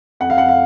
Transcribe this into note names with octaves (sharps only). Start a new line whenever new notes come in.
F2 F#5
F5
F2 F#5
F5